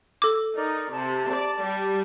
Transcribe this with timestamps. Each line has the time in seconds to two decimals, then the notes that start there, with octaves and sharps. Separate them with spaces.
0.22 A4 D6
0.57 D#4 A#4 D5
0.93 C3 A5
1.33 D5
1.64 G3